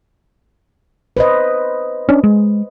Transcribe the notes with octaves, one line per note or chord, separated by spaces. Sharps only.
B4 C5 D#5
C#4 D4
G#3